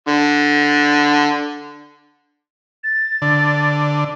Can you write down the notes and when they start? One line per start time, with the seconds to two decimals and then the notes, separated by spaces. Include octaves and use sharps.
0.08 D3
2.84 A6
3.22 D3